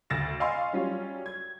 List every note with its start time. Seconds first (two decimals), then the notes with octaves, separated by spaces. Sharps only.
0.10 D2 A6 A#6 E7
0.40 D#5 F5 G#5 C6 C#6
0.73 F#3 G3 C#4 F4
1.26 G#6